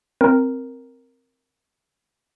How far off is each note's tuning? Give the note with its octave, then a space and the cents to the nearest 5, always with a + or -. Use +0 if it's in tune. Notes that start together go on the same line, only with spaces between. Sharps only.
C4 +0 F4 +0 A#4 +0